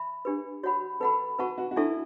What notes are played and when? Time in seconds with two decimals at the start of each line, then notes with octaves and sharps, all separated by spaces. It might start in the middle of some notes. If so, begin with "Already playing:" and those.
Already playing: E5 B5
0.25 D4 G4 B4
0.63 F#4 C#5 F#5 B5
1.00 A4 B4 F#5 B5
1.39 F#4 B4 F#5 A5 C#6
1.58 F#4
1.71 F#4
1.76 D4 E4 A4 E5 A5 C#6